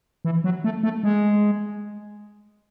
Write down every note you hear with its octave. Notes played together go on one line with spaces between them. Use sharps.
E3
F#3
A3
A3
G#3